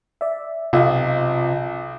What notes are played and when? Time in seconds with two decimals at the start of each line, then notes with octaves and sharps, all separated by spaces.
0.21 D5 E5
0.73 B1 C3 F4 D#5